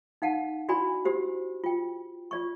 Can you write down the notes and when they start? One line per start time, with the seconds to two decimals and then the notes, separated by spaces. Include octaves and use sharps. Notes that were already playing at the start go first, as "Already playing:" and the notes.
0.22 D#4 F5 F#5 A5
0.68 E4 F#4 D5 G#5 B5 C6
1.05 F#4 G4 C5
1.64 F4 G5
2.31 F4 D5 C#6